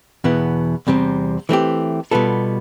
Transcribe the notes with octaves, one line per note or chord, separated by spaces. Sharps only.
E2 B2 B3 E4
E2 C3 G3 C4
E3 A3 C4 G4
B2 G3 B3 F4 A4